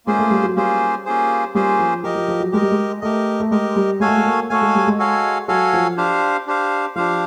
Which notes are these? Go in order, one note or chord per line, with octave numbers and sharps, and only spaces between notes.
G#3 A#3 C#4 F4 G#4 C5
A3
G3
F#3
G3 A#3 C#4 F4 G#4 C5
A#3 C#4 F4 G#4 C5
G3 A#3 C#4 F4 G#4 C5
F3
F3 G4 A#4 D#5
F3
F3
F#3
G#3 G4 A#4 D#5
G3
G#3
A3 G4 A#4 D#5
A3
G#3 G4 A#4 D#5
G3
G#3 F#4 A4 C#5 F5 G#5
A3
G#3
A#3
A3 F#4 A4 C#5 F5 G#5
G#3
G3
G#3
F#4 A4 C#5 F5 G#5
F#3 F#4 A4 C#5 F5 G#5
F3
D4 G4 C5 F5
D4 G4 C5 F5
F3 D4 G4 C5 F5